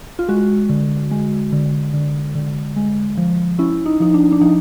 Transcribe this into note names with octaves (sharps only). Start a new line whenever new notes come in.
F4
G#3 F#4
D3
G#3
D3
D3
D3
G#3
F3
C#4 E4
D#4
F3 D#4
D4
D4
F3 D#4